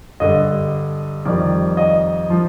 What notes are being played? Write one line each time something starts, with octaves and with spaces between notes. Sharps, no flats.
G2 D3 G3 D#5
F2 D#3 G3 D5
D#5
F3